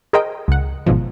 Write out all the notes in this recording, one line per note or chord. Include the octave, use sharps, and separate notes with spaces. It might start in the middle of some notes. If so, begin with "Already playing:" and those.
G#4 A#4 C5 D#5 G5
C#2 F#5
G1 G#2 B2 F3